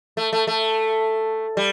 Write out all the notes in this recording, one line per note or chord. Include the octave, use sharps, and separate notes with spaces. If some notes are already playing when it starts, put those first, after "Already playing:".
A3
A3
A3
G3